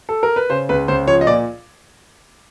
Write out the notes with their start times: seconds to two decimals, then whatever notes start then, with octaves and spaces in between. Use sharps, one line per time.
0.09 A4
0.23 A#4
0.36 B4
0.50 C#3 C5
0.69 C#2 B4
0.88 C#2 C5
1.08 F3 C#5
1.21 D#5
1.27 A#2 D5